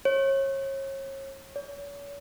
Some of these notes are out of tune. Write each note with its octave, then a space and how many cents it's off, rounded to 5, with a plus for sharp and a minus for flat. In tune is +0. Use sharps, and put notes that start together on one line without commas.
C#5 -35
C#5 +40